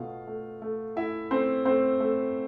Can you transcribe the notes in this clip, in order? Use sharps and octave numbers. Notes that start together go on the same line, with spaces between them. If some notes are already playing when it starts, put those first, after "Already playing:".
Already playing: B2 A3 F4 F5
A3
A3
A3 E4 E5
A3 C4 C5
A3 C4 C5
A3